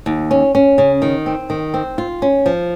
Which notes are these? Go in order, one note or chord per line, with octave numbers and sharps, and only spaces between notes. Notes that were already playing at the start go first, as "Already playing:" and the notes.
D#2
C#4
C#4
C#3
D#3
C4
D#3
C4
F4
C#4
F3